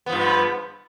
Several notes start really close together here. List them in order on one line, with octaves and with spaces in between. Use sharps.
B3 F3 G2